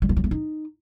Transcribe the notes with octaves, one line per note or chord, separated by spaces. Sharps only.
G3
F3
F#3
A3
D#4